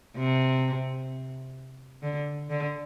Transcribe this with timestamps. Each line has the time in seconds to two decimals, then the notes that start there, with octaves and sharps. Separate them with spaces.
0.17 C3
2.03 D3
2.50 D3